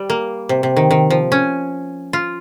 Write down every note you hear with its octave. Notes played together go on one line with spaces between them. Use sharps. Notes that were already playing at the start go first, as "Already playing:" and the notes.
Already playing: G3
A#3
C3
C3
D#3
D#3
F3
C#4
F4